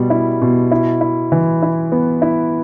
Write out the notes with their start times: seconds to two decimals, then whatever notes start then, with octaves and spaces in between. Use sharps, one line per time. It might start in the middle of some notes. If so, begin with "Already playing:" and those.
Already playing: B2 G3
0.10 E4
0.42 B2
0.71 E4
1.01 E4
1.32 E3
1.62 E4
1.92 B3
2.22 E4